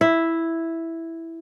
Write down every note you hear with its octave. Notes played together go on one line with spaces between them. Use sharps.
E4